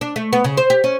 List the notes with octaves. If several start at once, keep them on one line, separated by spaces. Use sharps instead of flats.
D4
A3
B3
C#3
C5
G4
C#4